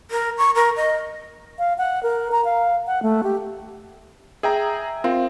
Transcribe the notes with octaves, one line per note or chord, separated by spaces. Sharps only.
A#4
C#6
A#4
D#5
F5
F#5
A#4
A#5
F5
F#5
A3
G4
G#4 E5 G5 A#5 D#6
C4 F4 A#4